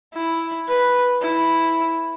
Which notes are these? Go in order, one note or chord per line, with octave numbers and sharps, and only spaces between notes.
E4
B4
E4